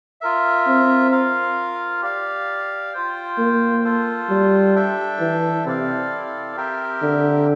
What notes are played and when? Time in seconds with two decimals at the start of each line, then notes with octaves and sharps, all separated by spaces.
0.21 F4 A#4 E5
0.66 C4
1.11 F4 A#4 F5
2.02 G4 D5 F5
2.93 F4 C5 G5
3.38 A#3
3.84 F4 A4 C5
4.29 G3
4.75 D4 A4 E5 G5
5.20 E3
5.65 C3 C4 E4 A4 D5 F5
6.56 C4 G4 A#4 E5 G5
7.02 D3